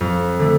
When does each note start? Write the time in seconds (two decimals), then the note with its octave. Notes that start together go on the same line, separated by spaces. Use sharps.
0.01 F2
0.39 D3 A3